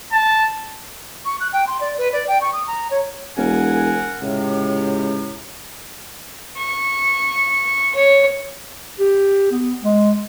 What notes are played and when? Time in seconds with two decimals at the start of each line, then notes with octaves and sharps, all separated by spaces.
0.13 A5
1.25 C#6
1.40 F#6
1.53 G5
1.67 C6
1.81 D5
1.98 B4
2.13 D5
2.28 G5
2.41 C#6
2.53 D#6
2.67 A#5
2.91 C#5
3.37 E1 A#4 F#5 G#5
4.21 C#2 A2 C3
6.58 C#6
7.94 C#5
8.99 G4
9.51 B3
9.83 G#3